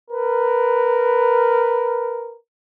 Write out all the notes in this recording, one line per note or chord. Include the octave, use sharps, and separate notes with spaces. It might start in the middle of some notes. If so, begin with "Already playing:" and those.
A#4 B4